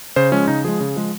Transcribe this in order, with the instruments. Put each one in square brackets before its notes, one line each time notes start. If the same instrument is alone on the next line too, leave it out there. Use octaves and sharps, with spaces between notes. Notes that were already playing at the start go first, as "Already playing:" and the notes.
[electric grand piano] C#3 C5
F3 G#3 C#4
C#3 D#4
F3 G#3 G#4
C#3
F3 G#3